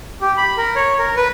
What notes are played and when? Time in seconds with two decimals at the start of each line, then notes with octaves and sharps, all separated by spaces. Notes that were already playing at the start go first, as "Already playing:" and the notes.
0.21 G4
0.37 B5
0.57 A#4
0.76 C#5
0.98 A#4
1.16 B4